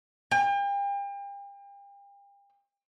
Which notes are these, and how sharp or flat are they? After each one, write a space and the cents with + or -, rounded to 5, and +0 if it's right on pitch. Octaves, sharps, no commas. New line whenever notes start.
G5 +40